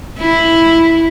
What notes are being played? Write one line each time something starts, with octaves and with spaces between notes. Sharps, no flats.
E4